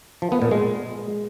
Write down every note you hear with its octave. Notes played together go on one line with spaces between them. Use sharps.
F3
B3
A#2
G#3